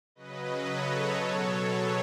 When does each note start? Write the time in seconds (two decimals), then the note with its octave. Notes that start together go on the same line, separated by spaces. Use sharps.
0.15 C#3 F#3 B4 D#5
0.65 A4 C#5
1.16 B2 F#3
1.66 G#4 B4